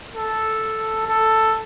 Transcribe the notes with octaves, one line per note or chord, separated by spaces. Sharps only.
A4
A4